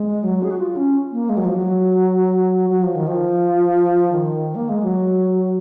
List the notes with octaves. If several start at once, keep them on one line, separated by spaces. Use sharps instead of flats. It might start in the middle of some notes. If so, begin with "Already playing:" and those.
Already playing: G#3
F#3
G#4
F#4
F4
C#4
A#3
G#3
F#3
F3
F#3
F#3
F3
D#3
F3
D#3
A#3
G#3
F#3